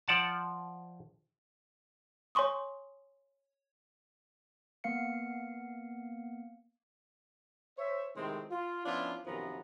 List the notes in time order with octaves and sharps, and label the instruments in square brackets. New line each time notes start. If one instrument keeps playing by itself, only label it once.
[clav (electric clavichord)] F3 D5 F#5 A5
[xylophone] C#5 G#5 C6 C#6 D#6
[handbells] A#3 B3 F5 C#7
[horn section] C5 C#5 E5
A2 C3 D#3 G#3 C4
F4
F3 B3 C#4 D4 E4 F4
F#2 C3 D#3 F3 B3 A#5